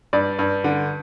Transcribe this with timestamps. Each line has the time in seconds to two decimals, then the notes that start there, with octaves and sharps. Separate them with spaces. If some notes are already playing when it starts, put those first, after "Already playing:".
0.13 G2 D5
0.39 G2
0.64 D3